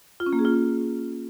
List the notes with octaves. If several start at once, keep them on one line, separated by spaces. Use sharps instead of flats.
F4
C#4
A#3
G#4
F4